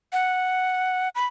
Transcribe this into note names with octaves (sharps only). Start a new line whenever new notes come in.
F#5
B5